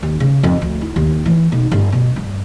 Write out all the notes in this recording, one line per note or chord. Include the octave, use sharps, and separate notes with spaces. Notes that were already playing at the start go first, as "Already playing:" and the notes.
D#2
C#3
F2
D2
E4
D#2
E3
B1
G1
B2
G2